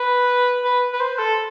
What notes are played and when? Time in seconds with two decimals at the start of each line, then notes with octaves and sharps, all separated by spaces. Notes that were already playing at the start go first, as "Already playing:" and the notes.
Already playing: B4
0.64 B4
0.93 B4
1.00 C5
1.18 A4